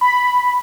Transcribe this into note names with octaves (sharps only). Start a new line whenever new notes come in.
B5